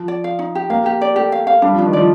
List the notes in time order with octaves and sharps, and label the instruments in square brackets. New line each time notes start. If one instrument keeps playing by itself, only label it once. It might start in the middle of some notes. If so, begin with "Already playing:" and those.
Already playing: [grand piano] F3
[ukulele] D5
F5
D#4
G4
[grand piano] A#3 [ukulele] F5
[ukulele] G4
D5
[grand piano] A3 [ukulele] G4
[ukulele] F5
F5
[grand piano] G3 [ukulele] D4
[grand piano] F3 [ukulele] D4
[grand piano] D#3
[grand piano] F3 [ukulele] D5